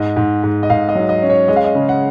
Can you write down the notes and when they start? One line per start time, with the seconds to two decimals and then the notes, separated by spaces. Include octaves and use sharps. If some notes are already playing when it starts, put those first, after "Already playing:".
Already playing: G#2 D#5
0.17 G#2
0.43 G#2
0.63 D#5
0.70 G#2 F5
0.89 D#5
0.95 F#3
1.09 D#5
1.22 C#4
1.29 C#5
1.48 G#3 D#5
1.56 F5
1.64 D#5
1.75 C#3
1.89 F#5